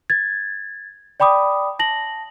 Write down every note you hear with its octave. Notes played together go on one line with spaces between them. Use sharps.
G#6 A6
D5 G5 B5 D6 D#6
A5 A#6 F#7